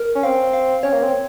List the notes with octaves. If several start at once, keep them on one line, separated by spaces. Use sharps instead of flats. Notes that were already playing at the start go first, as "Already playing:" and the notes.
Already playing: A#4
C#4
C4 F5
F5
C#4 C#5
A#3
C4